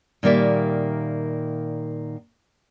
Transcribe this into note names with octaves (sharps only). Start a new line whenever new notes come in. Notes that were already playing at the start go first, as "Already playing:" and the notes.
A#2 D#3 G3 A#3 D5 E5